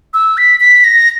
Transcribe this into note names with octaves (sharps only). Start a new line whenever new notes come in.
E6
B6
B6
A#6